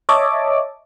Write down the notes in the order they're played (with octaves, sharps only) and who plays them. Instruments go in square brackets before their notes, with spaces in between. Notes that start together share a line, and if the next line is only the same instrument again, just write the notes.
[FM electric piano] C#5 D#5 E5 A5 D6